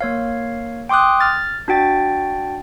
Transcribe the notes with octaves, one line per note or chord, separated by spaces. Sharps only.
A#3 C#5 F5
G5 C6 D6 D#6 F#6
F6 A6
D4 F#4 G5 A6